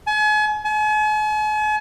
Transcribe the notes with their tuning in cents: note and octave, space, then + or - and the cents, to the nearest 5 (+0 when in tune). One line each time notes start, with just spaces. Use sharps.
G#5 +40
G#5 +45